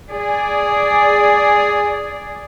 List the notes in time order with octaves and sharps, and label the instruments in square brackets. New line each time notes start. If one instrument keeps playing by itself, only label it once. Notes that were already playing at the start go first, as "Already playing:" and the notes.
[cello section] G#4 D5